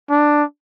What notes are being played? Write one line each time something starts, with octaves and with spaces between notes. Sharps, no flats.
D4